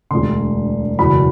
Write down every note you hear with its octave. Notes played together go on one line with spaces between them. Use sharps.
E1 D2 D3 C6
F#1 E2 B2 B5